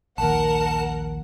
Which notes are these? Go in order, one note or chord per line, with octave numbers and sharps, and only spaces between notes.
A#1 D#2 A#4 F#5 A5